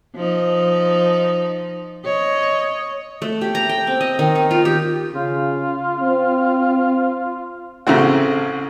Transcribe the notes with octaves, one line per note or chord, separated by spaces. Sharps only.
F3 D#4
C#5 D#5
A3
G4
A#5
G5
C4
D#5
D#3
D#4
F4
G4
C#3 F4
C4
A1 C#3 A3 C4 F#4